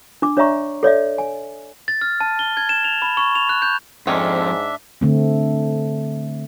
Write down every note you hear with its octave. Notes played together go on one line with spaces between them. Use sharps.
D4 D6
D4 C#5 D5 E5 A#5 C#6
A4 C#5 D5 E5
G#5
A6
F6
A5
G7
G#6
E7
F7
B5
C#6
F7
F#6
G6
F2 G#2 D#3 C#4 D4 E5
D3 A3 C4